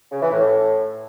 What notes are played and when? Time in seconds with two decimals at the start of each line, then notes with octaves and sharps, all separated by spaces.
0.11 C#3
0.21 E3
0.32 A2